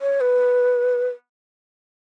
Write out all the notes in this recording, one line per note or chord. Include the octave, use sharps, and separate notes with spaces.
C#5
B4